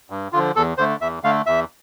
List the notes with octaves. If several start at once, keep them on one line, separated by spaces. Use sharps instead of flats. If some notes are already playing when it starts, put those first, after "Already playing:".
G2
D3 F3 F4
E2 A4
D3 A3 C5
E2 E5
D3 A3 F5
E2 E5